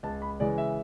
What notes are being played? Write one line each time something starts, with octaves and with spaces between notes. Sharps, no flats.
C#2 A5
B5
C#3 E3 G#3 D5
E5